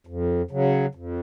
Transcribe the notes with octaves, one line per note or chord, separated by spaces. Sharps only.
F2
C#3 F#3
F2